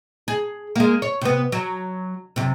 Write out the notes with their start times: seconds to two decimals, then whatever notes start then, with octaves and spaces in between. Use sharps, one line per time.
0.28 G#4
0.76 G#3 A#3
1.02 C#5
1.21 C3 B3
1.52 F#3
2.36 F#2 C3